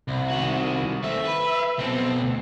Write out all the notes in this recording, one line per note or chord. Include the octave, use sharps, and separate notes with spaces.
C2
D#3 F#4
A3 C4 E5
B4
B2 C4 A4
D2